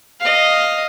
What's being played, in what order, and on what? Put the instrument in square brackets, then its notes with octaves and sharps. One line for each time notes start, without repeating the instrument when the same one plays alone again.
[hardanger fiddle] D#5 F5